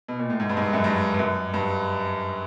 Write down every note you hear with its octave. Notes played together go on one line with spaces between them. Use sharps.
B2
A#2
A2
G#2
G2
G#2
G2
F#2
G2
G2
F#2
G2